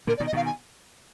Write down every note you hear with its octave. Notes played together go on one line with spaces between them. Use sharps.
A#2 D3 A#4
D5
B2 D#3
D#5
B2 D#3 F5
G#5